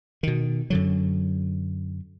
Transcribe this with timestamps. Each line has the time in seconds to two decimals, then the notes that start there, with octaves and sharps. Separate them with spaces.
0.23 B2 D#3
0.70 F#2 D3 F#3